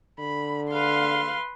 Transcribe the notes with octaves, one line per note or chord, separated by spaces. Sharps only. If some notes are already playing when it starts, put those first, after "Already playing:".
D3 B5
B4 F5 C6